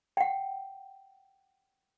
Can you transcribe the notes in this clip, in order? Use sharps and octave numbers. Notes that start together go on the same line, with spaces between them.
F#5 G5